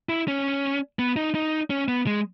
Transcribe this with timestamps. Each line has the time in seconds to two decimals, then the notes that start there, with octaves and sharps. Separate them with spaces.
0.09 E4
0.28 C#4
0.99 B3
1.16 D#4
1.35 D#4
1.70 C#4
1.88 B3
2.07 G#3